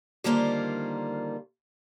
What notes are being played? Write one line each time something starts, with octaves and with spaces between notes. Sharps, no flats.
D3 D#3 G3 A#3 F4 C5